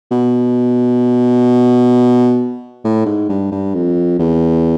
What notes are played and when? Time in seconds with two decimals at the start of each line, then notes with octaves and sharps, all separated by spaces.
0.11 B2
2.84 A2
3.06 G#2
3.29 G2
3.52 G2
3.74 F2
4.19 E2